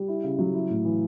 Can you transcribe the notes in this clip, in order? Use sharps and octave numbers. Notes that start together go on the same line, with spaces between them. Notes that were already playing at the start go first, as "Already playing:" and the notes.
Already playing: G3
E4
C#3
F#3
E4
A2
E3